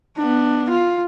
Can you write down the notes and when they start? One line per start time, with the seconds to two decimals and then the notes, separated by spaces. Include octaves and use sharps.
0.17 B3 D4
0.70 F4